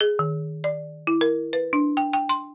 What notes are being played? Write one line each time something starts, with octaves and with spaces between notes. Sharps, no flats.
G#4
D#3
D5
E4
A#4
B4
D4
G5
G5
C6